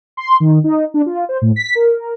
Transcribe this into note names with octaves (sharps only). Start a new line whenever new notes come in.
C6
D#3
D#4
D4
F4
C5
A2
B6
A#4